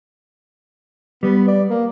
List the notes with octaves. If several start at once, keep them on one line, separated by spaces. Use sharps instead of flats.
G3 B3
D5
A#3